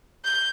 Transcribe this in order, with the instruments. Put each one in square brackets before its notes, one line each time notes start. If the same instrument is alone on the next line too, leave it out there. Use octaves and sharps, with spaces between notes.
[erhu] G6